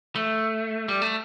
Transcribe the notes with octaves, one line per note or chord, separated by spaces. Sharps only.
A3
G3
A3